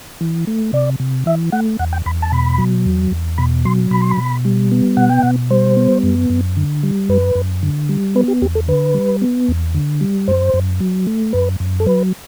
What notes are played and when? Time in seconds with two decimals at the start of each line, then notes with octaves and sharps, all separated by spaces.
0.21 E3
0.47 A3
0.73 C3 D5
1.00 C3
1.26 E3 E5
1.52 A3 F#5
1.79 E2 F#5
1.93 G5
2.06 E2 B5
2.22 A5
2.32 B2 B5
2.58 F#3
2.86 E2
3.11 E2
3.38 B2 B5
3.65 F#3 C6
3.91 B2 B5
4.02 C6
4.11 B5
4.17 B2
4.45 G3
4.71 B3
4.97 B2 F#5
5.09 G5
5.22 B2 F#5
5.50 G3 C5
5.76 B3
6.03 F#2
6.30 F#2
6.57 D3
6.83 G3
7.09 F#2 B4
7.35 F#2
7.63 D3
7.89 G3
8.15 B3 B4
8.28 G4
8.42 E2 G4
8.55 A4
8.68 D3 B4
8.94 G3
9.22 B3
9.48 E2
9.74 D3
10.01 G3
10.28 F#2 C5
10.54 F#2
10.80 F#3
11.07 A3
11.33 F#2 B4
11.60 F#2
11.80 A4
11.86 F#3 B4